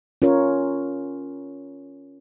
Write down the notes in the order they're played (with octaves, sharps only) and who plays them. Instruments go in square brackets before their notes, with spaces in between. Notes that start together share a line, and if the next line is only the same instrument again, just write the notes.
[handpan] C#4 F4 A#4 C#5